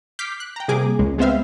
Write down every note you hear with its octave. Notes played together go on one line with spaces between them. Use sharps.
D6 F6 G6 B6 C7
F#6
G5 A#5
C3 G3 A#3 G#4 D6
C#2 G#3
G#3 B3 C4 C5 E5 F5